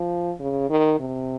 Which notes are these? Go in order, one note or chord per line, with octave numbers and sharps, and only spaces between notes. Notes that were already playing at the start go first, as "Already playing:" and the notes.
Already playing: F3
C#3
D#3
C3